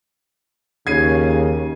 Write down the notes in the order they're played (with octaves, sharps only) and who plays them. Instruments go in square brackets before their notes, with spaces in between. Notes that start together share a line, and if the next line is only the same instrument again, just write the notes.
[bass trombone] D#2 [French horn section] C#3 [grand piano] G#6 C7 D#7